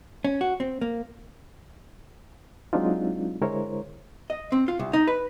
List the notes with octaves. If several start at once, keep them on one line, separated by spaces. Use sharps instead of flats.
C#4
F#4
C4
A#3
F#3 G#3 C4 D4 D#4 F4
D3 G#3 E4 A#4 C5 C#5
D#5
C4
F4
C2
D#4
B4